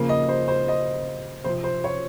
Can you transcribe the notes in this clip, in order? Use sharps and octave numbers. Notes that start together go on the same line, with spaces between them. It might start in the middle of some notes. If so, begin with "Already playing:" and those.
Already playing: C#3 F3 A#3
D#5
C5
C5
D#5
C3 F3 C4 C5
C5
C#5